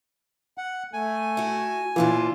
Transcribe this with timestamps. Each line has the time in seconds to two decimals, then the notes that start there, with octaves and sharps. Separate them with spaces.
0.58 F#5
0.93 A3 G#5
1.37 E4 F#4
1.96 D#2 A#2 E3 D4 F4